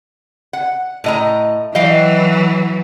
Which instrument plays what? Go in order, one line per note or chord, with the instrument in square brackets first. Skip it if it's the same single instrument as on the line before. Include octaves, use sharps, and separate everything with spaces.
[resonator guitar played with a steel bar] F#5
A2 D#5 A#5
[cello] E3 F#3 [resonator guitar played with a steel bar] D#5 F5 G5